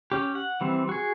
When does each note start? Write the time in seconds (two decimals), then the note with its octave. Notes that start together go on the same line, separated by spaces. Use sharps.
0.12 C#4 G4
0.35 F#5
0.61 E3 G3 C4
0.89 F#4 G#4